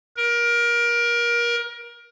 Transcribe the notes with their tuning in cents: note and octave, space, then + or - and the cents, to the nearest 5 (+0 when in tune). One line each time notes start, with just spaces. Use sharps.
A#4 +25